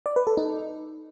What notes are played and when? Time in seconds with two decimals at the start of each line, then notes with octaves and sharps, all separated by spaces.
0.06 D5
0.16 B4
0.27 A4
0.37 D#4